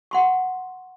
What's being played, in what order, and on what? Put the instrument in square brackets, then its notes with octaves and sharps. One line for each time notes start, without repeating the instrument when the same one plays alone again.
[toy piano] F#5 C6 C#6